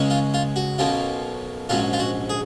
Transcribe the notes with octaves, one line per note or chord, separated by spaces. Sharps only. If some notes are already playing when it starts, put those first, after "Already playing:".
Already playing: C#2 C#3 G#3 C#4
F4
F4
F#4
B1 B2 A#3 C#4 F4
A#1 G#2 F#3 C#4 F4
F4
F#4
G#4